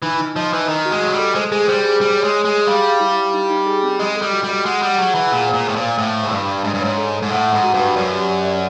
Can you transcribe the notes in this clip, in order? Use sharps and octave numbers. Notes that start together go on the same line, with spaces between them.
E3 D#4
D#4
F3 D#5
E3 D#4
D#3 D#5
F#4
G#3
F#3 D#5
G3
A4
G#3 C5
G#3 G#4
G3 C5
G#4
G3 G#4
C#5
G#3
G#4
G#3
G#4
G3 F5
F5
E4
F5
D#4
D#4
G#4
C4
G#3 D#5
A4
G3
F#4
G3
D#5
G#3 F#5
G3 F#5
F#3 G#4
E3 F#5
A#2 G#4
C5
A#2
A2 C5
A#2
C5
A2 F5
F5
G#2
G2 D5
D5
G#2 D4
G2
G#2 C#5
A4
A4
G#2
A2 F#5
F#5
G#2
F#4
G2
B4
F#2 D5
G4
D5
D5